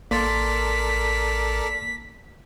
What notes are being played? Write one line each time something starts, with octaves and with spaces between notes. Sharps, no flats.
A1 A#3 A4 A#4 D5 C6 A6 B6